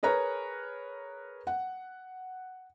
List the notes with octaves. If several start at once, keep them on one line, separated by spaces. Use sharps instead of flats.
G#4 A#4 B4 C#5 A#5
F#5